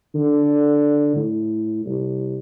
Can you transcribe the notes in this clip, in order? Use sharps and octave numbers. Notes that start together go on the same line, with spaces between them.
D3
A2
C2